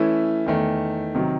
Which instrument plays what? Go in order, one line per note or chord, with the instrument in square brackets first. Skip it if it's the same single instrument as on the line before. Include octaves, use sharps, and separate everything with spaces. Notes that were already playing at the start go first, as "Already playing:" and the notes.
Already playing: [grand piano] E3 A3 C#4 E4
E2 D#3 A3
C3 D#3 F#3